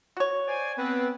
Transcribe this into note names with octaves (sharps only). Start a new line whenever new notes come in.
F#4 C#5
C5 D5 G#5
B3 C4 B4